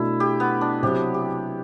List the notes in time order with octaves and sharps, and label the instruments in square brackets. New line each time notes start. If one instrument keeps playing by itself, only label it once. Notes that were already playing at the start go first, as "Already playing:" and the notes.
Already playing: [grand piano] B2 A3 D4 A4 [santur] E4
[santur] G4
B3
D4
[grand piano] C3 F#3 C4 F#4 [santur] G4
[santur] G4